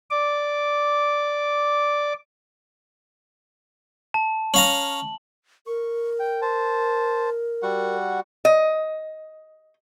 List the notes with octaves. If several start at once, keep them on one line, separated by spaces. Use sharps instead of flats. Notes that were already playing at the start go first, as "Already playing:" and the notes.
D5 D6
A5
C#4 F5 A#5 F#7
A#4 C#6
G5
C5 A5
G3 F#4 F#5
D#5